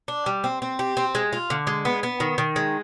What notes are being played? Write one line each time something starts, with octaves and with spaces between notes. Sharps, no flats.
D4
G3
C4
C4
G4
C4
G#3
F4
D3
G#3
B3
B3
D#3
D#3
G#3